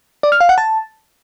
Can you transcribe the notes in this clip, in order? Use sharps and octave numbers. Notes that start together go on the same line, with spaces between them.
D5
F6
F5
F#5
A5